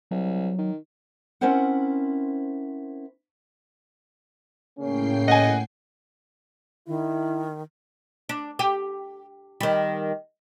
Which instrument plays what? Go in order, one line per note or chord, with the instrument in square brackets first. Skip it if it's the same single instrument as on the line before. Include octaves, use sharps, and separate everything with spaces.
[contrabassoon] C2 [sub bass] F#3
[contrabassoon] D#3
[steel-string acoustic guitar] C4 C#4 E4 A#4 C5 F#5
[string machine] A2 G5 C7 [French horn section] C#3 A#3 C#4
[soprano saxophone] D#5 [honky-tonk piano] F#5 G#5
[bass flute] D#3 [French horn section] E4
[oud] D4
G4
D#3 G3